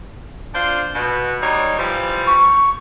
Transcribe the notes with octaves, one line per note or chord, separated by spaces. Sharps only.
D4 F4 C5
B2
G3 D#4 C#5
E3 F3 G3
C#6